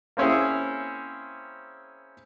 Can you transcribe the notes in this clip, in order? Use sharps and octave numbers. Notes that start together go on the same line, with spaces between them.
A#3 C4 C#4 E4 G#4